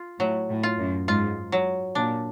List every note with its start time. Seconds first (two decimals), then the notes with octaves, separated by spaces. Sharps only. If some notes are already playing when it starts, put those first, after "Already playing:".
Already playing: F4
0.19 A2 F#3
0.49 A2
0.63 F4
0.78 F#2
1.08 G#2 F4
1.52 F#3
1.95 A#2 D4